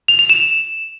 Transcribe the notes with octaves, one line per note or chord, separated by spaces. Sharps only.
F7
F7
E7